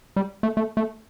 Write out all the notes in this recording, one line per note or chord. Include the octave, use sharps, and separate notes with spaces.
G3
A3
A3
A3